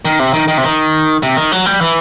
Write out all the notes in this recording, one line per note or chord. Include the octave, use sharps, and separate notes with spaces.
D#3
C3
D#3
D#3
C3
D#3
C3
D#3
F#3
G3
E3